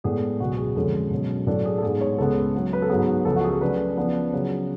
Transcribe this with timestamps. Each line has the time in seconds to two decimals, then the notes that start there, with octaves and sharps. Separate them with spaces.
0.04 A2 G#3 B3 D4 G#4
0.40 C#2 B2 F#3 B3 F#4
0.58 G#4
0.76 F2 D3 G#3 C#4 A4
1.11 B2 F#3 C#4
1.47 A2 F#3 A3 D4 A4
1.65 G#4
1.78 A4
1.83 G#2 G#3 B3 G#4
2.01 C#5
2.18 C#2 C#3 G#3 B3 A4
2.55 C#3 F#3 C#4
2.73 B4
2.82 A4
2.90 G#2 F#3 B3 G#4
3.25 C#2 C#3 F3 A4
3.36 F#4
3.44 G#4
3.53 A4
3.61 C#3 F#3 A3 D4 B4
3.97 C#3 F3 B3 D4
4.33 C#3 F#3 C#4